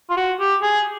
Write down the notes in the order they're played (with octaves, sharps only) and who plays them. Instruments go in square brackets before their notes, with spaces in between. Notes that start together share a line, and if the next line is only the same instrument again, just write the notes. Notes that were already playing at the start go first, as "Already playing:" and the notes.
[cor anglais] F4
F#4
G4
G#4